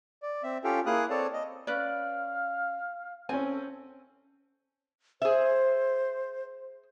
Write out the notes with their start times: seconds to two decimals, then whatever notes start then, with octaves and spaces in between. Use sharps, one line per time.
0.22 D5
0.43 C4 E5
0.64 C#4 F4 G4 A4 F5 G5
0.86 A#3 E4 G#4 F5 D#6 F#6
1.10 C4 A4 C#5 D5 A5
1.33 D#5
1.67 C#4 B4 D5 F5
3.29 C4 C#4 A4 G#5
5.22 G#4 C5 E5